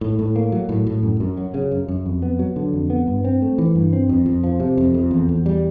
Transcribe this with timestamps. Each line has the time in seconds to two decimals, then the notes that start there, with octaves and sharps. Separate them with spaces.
0.01 A2
0.19 A2
0.36 A#3
0.52 F#3
0.69 A2
0.87 A2
1.03 F#2
1.20 F#2
1.37 F#3
1.54 C#3
1.71 F#2
1.88 F#2
2.06 F2
2.22 B3
2.39 F#3
2.56 D3
2.73 F2
2.90 B3
3.07 G2
3.24 C4
3.42 A3
3.58 E3
3.75 G2
3.93 C4
4.09 F2
4.26 F2
4.43 F3
4.60 C3
4.77 F2
4.94 F2
5.11 E2
5.29 E2
5.46 G3